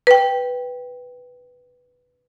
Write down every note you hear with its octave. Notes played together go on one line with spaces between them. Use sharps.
B4 G5